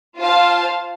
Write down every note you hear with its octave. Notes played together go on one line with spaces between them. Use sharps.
F4 C5 F5 A5